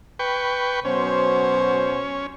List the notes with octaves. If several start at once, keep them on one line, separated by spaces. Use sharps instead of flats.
B4 G5 C#6
B2 F#3 C#4 C5